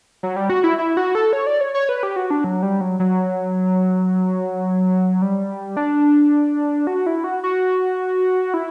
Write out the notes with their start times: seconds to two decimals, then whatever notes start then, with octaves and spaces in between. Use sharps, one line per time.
0.23 F#3
0.36 G3
0.50 F#4
0.64 E4
0.78 E4
0.97 F#4
1.15 A4
1.33 C#5
1.47 D5
1.61 C#5
1.74 C#5
1.89 B4
2.03 G4
2.16 F#4
2.30 D4
2.44 F#3
2.63 G3
2.81 F#3
3.00 F#3
5.22 G3
5.77 D4
6.87 F#4
7.06 E4
7.24 F#4
7.44 F#4
8.54 E4